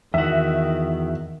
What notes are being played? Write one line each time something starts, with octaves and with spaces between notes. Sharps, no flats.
E2 D#3 F#4 E5